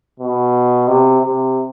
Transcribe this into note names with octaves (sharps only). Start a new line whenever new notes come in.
B2
C3
C3